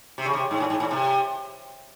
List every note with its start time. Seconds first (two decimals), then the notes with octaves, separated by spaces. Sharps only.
0.18 C3
0.26 C#3
0.34 C3
0.51 G#2
0.60 A2
0.70 G#2
0.80 A2
0.91 C3